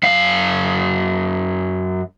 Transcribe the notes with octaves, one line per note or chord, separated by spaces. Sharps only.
F#2 F5